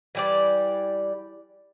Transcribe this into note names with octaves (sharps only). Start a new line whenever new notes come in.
E3 G3 D5